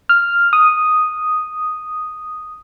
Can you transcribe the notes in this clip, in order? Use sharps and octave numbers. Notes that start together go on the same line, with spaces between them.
F6
D#6